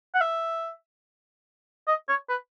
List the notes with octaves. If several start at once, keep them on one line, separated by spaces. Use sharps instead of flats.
F#5
E5
D#5
C#5
B4